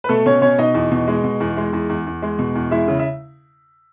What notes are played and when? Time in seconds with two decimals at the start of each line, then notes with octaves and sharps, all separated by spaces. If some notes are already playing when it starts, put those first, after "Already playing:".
0.04 B4
0.09 B2 A3 A4
0.26 B2 C#4 C#5
0.42 B2 C#4 C#5
0.58 B2 D#4 D#5
0.74 E2
0.92 B2
1.08 G#3
1.24 B2
1.40 E2
1.57 G#3
1.73 E2
1.89 E2
2.06 E2
2.22 G#3
2.39 B2
2.55 E2
2.71 G#3 E4 E5
2.88 C#3
2.99 E5